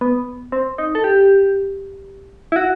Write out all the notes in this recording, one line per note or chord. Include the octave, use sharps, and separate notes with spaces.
B3
C4
D#4
A4
G4
E4
F#4